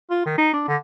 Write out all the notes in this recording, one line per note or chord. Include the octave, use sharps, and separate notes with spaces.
F4
D#3
D#4
D4
D3